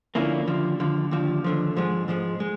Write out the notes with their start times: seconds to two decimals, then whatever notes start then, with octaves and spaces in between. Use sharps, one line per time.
0.15 D3 F3 A#3 C#4 E4
0.47 D#2 D3 F3
0.80 D#2 D3 F3
1.11 D#2 D3 F3
1.44 D#2 D3 F3
1.76 G#2 F3 G#3
2.08 G#2 F3 G#3
2.40 G#3